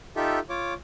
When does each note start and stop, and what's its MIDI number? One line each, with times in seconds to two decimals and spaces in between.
0.16 0.39 63
0.16 0.39 65
0.16 0.39 67
0.16 0.39 69
0.16 0.39 76
0.49 0.74 65
0.49 0.74 73
0.49 0.74 86